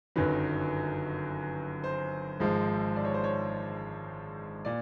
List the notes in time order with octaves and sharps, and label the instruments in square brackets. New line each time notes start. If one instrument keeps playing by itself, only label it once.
[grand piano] G1 F#2 D#3 F#3 B4
C5
G#1 G#2 F3 G#3
D5
C#5
C5
C#5
A#2 D5